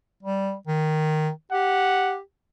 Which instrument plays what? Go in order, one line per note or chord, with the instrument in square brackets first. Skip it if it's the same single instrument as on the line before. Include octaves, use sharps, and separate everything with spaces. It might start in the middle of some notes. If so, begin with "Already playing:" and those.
[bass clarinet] G3
D#3
[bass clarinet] G4 [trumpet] F#5